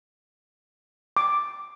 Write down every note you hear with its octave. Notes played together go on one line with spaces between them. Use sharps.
D6